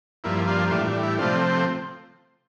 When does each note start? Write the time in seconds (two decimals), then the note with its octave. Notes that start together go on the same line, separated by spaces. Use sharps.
0.24 G2 F3 A#3 E4
0.48 D4 F4
0.71 A2 E3 G3 D4 F4
0.87 D4
1.03 E4
1.19 C3 F3 A3 C4 D4 F4